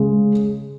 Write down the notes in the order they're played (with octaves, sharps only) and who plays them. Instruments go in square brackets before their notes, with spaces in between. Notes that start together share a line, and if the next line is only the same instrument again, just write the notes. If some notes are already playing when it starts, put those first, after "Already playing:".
Already playing: [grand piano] C#3 G#3